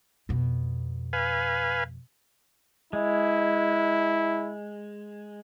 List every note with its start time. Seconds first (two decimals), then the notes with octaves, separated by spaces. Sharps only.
0.29 F2 B2
1.13 B4 F5 G#5
2.93 G#3 E4